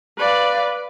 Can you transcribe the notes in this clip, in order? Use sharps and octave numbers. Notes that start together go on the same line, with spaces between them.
B4 D5 F5